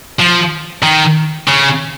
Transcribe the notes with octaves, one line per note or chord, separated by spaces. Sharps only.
F3
D#3
C#3